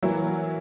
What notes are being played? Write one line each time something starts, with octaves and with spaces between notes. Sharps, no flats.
E3 F#3 A#3 E4